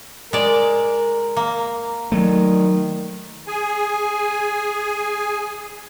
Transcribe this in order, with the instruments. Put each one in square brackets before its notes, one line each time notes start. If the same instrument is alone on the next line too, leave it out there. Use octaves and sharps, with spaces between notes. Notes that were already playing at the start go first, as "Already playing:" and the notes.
[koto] G#3 D5 [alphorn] A#4
[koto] A#3
[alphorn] D#3 [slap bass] F#3 A3
[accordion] G#4 G#5